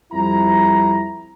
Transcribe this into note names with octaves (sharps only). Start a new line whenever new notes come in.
F2 G3 E4 A#5